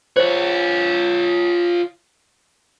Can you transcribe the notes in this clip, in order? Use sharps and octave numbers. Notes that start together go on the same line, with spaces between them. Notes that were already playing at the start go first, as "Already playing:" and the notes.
F4 C5 C#5